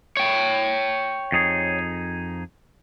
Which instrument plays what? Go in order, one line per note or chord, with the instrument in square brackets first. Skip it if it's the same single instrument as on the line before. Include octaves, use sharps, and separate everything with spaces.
[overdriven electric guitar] C#5 G5
[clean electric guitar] F2 D#4 G#4